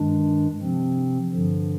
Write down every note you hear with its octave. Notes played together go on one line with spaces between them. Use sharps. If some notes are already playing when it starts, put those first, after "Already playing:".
Already playing: G2 D#3 G#3 D4
C3 F3 C4
G2 D3 F3